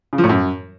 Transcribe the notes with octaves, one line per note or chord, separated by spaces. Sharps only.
C#3
F3
A2
F#2